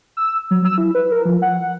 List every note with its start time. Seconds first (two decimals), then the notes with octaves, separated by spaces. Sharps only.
0.17 E6
0.51 F#3
0.65 E6
0.78 E4
0.95 B4
1.12 A#4
1.25 F3
1.42 F#5